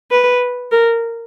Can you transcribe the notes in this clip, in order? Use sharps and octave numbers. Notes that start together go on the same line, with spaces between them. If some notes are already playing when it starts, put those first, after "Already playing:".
B4
A#4